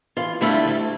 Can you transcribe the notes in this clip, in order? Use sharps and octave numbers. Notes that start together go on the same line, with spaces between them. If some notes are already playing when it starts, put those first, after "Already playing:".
E3 F4
D3 G3 A3 E4 F4 A4
D2